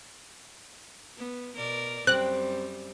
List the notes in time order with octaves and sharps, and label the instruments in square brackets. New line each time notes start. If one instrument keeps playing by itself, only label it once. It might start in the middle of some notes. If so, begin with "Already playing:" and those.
[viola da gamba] B3
B2 A#4 D5
[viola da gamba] F#2 G3 [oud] C4 [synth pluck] F#6